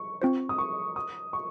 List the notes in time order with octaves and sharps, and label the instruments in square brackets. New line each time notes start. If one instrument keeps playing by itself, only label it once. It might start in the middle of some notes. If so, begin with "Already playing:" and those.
Already playing: [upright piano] C#6
[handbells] C4 F4 C5
[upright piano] D#6
C#6
D#6
C#6